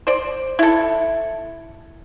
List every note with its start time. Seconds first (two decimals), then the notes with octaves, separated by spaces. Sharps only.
0.07 C5 D5
0.59 E4 A4